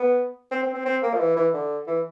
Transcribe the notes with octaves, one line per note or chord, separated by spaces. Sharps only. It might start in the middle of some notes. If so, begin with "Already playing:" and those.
Already playing: B3
C4
C4
C4
C4
A#3
F3
E3
E3
D3
E3